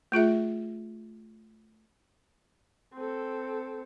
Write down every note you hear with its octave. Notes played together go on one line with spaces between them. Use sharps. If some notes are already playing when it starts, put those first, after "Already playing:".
A3 F4 G#4 E5
C4 A4